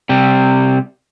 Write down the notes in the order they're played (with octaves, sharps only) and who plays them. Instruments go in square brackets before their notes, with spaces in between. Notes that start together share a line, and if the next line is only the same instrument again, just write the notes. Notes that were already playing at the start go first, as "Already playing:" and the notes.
[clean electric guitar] C3 G3